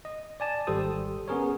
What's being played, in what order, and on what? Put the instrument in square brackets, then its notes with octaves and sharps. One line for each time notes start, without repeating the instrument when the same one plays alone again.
[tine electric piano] D#5
D5 G#5 A5
G#1 G3 G4 A4 C5 D#6
B3 C#4 G#4 A#4 C#5